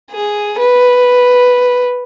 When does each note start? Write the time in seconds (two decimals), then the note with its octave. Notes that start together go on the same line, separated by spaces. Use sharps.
0.11 G#4
0.58 B4